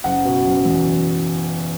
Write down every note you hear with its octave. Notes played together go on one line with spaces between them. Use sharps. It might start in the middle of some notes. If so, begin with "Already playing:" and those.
F#1 F#5
B2
F#1
E2